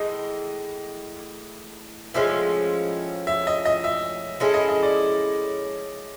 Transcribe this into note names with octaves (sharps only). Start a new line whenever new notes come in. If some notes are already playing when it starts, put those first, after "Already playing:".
Already playing: A2 E3 G#3 D#5
A2 F3 G#3 C#4 E5
E5
D#5
D#5
E5
G#3 C#4 E4 A4 D#5
D#5
D#5
D5